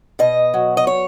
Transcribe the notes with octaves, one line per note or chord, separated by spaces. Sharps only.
B2 D#5
F#3
D#5
C#5